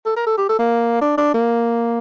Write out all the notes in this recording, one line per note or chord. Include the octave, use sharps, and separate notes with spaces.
A4
A#4
A4
G4
A4
A#3
D4
D4
A#3